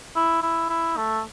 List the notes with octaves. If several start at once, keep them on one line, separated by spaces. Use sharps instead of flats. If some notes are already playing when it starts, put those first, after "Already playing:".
E4
E4
E4
A3